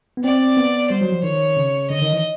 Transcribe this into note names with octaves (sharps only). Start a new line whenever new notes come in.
B3
C4 D5
B3
G3 C5
F#3
F3
D#3 C#5
C#3
D3 D#5
D#3
E3